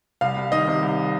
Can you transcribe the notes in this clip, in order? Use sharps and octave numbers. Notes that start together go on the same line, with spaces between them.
C2 F5
C2
D#3 D#5
C3
C2